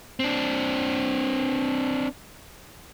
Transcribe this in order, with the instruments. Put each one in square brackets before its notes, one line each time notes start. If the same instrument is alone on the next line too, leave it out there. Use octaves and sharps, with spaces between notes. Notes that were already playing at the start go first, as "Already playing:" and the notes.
[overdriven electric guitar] C4 D4